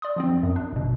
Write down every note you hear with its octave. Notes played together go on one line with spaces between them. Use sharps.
D5 C6 D#6
F3 B3 C4
F2
F#2
D4
G1 B2